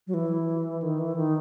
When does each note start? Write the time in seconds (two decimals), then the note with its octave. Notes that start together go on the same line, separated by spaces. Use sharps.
0.07 F#3
0.14 E3
0.82 D#3
0.99 E3
1.16 D#3